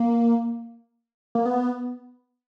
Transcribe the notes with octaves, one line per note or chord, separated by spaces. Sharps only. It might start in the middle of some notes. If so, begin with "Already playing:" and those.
Already playing: A#3
A#3
B3